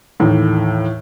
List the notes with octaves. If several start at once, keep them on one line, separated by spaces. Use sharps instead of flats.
D#2 A2 E3